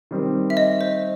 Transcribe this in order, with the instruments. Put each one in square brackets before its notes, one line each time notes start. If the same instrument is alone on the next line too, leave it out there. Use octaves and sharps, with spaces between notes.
[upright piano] D#3 G3 C4
[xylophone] E5
D#5
C5